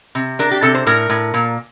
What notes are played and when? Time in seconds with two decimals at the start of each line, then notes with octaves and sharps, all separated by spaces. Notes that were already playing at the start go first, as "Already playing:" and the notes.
0.15 C3
0.39 D4 A#4
0.51 G4
0.62 C3 A4
0.75 C5
0.87 A2 A#4
1.10 A2
1.34 A#2